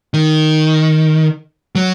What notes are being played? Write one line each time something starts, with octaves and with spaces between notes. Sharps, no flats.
D#3
F#3